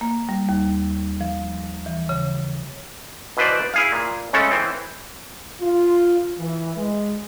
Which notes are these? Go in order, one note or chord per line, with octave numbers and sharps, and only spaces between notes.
A#3
G3
D#2
F3
E3
C#3
B2 E3 B4 C5 D5
E4 G#4 F5
A#2
C#3 G#3 A3 C#4 A4
E3 C4
F4
E3
G#3